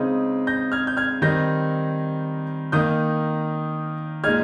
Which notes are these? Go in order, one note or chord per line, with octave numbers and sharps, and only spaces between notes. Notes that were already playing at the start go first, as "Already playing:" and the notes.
Already playing: C#3 G#3 C4 D#4 D#6
G6 A#6
F6 G#6
G6
F6 G#6
D#3 G3 C4 D#4 G6 A#6
D#3 A#3 D#4 D#6 G6
A#2 G#3 D#4 F6 G#6